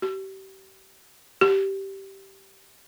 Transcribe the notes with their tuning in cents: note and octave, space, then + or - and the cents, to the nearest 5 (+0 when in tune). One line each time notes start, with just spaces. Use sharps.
G4 -35
G4 -15